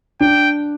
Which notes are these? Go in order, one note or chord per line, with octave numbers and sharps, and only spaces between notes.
D4 G5